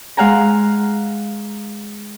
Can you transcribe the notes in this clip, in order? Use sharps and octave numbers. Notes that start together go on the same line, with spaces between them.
G#3 F5 F#5 G#5 A#5